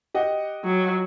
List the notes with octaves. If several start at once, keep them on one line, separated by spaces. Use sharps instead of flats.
G4 D#5 F#5
F#3